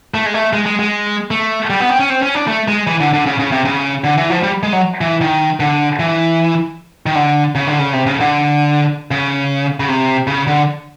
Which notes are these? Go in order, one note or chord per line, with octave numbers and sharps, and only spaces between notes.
A3
G#3
A3
G#3
G#3
G#3
A3
G3
B3
C4
C#4
C4
C#4
D4
A3
G#3
E3
D3
D3
C#3
C#3
C3
C#3
D3
E3
F3
G3
G#3
F#3
E3
D#3
D3
E3
D#3
D3
C#3
D3
C#3
C3
C#3
D3
C#3
C#3
C3
C#3
D3